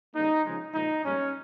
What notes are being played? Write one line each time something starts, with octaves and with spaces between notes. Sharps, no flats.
C#3 G3 A#3 D#4
C#3 F3 G#3
A#2 F3 G#3 D#4
G#2 G3 A#3 C#4